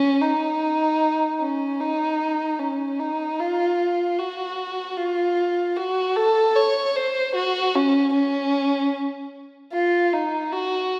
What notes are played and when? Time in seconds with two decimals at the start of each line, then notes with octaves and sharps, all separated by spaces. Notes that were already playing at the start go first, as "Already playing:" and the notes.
Already playing: C#4
0.22 D#4
1.41 C#4
1.81 D#4
2.59 C#4
2.99 D#4
3.39 F4
4.18 F#4
4.97 F4
5.77 F#4
6.16 A4
6.56 C#5
6.96 C5
7.35 F#4
7.75 C#4
8.14 C#4
9.73 F4
10.13 D#4
10.52 F#4